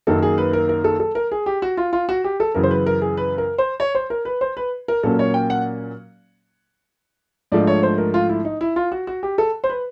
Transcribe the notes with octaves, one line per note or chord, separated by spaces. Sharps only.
F#2 D#3 F#3 A#3 A4
G#4
B4
A#4
A#4
A4
A4
A#4
G#4
G4
F#4
F4
F4
F#4
G4
A4
F#2 C#3 E3 A#4
C5
B4
A#4
G#4
B4
A#4
C5
C#5
C5
A#4
B4
C5
B4
A#4
A#2 F#3 A#3 C#4 A4
C#5
G5
F#5
G#2 F3 A3 D4 D5
C#5
C5
A#4
F4
E4
D#4
E4
F4
F#4
F#4
G4
A4
C5
B4